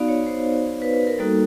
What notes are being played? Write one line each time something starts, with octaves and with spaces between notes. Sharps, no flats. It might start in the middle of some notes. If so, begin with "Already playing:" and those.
Already playing: B3 D#4 F#4 D5 F5
C#5
C5
B4
B4
A#4
G3 A#3 D#4 F#4 A4